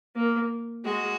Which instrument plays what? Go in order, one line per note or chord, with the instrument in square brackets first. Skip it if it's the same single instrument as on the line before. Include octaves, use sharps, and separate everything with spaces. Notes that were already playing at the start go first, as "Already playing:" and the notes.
[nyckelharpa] A#3
[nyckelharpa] G#3 [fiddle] F#4